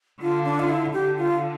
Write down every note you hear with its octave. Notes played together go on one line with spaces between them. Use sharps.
D3 F4
D4
F4
E4
D3 G4
F4